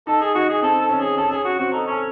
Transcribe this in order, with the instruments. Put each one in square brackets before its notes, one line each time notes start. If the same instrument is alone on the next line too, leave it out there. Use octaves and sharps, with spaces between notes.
[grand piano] D#4 [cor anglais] A4
[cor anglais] G#4
[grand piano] D#4 [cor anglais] F#4
[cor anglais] G#4
[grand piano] C4 [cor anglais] A4
[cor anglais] A4
[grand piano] C#4
[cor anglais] G#4
[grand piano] C#4 [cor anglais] A4
[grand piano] C#4 [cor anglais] G#4
[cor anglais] F#4
[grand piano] C4 [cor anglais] F#4
[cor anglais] D#4 [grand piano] A4
[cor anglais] C#4 [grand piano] A4